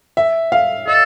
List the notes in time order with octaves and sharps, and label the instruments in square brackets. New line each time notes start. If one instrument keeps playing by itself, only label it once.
[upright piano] E5
F5
[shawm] A4 [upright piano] D#5